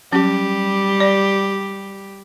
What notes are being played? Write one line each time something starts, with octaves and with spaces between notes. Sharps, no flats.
F#3 G3 C#4 G4
D5